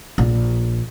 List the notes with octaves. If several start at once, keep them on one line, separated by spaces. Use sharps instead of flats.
A#1